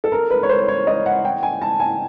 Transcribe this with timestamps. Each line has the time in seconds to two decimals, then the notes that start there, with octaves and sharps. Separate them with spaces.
0.04 A4
0.12 A#4
0.30 B4
0.43 C#5
0.49 C5
0.68 C#5
0.87 D#5
1.06 F#5
1.25 G5
1.43 G#5
1.62 A5
1.80 G#5